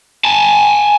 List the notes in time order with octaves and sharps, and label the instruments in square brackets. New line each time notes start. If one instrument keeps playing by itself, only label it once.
[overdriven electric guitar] G#5 A5